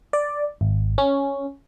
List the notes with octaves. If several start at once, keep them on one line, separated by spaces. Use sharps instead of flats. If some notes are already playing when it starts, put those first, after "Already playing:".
D5
G#1
C#4